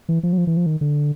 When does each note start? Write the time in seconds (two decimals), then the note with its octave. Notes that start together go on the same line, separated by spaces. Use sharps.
0.09 E3
0.23 F3
0.33 F#3
0.38 F3
0.47 E3
0.57 F3
0.66 D#3
0.81 D3